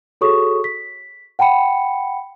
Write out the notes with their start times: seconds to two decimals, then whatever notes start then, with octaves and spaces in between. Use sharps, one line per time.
0.21 F#4 G#4 A4 C#5 C#6 D#6
0.64 B6
1.39 F#5 G5 A5 B5 C#7